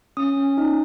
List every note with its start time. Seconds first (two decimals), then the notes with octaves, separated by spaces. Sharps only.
0.17 C#4 D#6
0.37 C#4
0.58 D#4